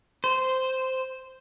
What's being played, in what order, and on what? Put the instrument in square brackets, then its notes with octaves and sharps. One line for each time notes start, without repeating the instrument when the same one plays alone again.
[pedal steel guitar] C5